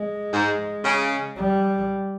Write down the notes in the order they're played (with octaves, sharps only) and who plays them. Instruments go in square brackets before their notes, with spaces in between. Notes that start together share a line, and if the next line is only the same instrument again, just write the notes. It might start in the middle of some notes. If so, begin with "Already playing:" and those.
Already playing: [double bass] G#3
[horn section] G#2
C#3
[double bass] G3